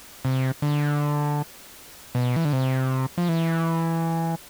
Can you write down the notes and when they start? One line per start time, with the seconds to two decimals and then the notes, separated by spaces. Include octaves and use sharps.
0.25 C3
0.62 D3
2.15 B2
2.36 E3
2.45 D3
2.53 C3
3.18 F3
3.29 E3